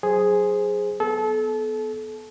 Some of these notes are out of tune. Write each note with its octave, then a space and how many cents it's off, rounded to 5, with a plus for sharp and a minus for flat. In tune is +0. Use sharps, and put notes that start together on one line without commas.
F#3 +20 G#4 +0 C5 +0
B3 +0 A4 -30